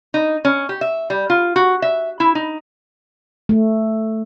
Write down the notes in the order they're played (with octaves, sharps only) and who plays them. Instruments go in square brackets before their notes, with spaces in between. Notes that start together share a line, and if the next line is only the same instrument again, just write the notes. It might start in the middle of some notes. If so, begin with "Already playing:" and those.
[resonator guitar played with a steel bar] D#4
C#4
G4
E5
G3
F4
F#4
E5
E4
D#4
[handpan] A3